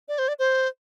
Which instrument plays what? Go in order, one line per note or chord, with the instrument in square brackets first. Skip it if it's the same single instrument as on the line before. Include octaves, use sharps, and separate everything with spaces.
[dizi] D5
C5
D5
C5